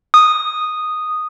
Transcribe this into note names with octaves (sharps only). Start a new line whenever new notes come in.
D#6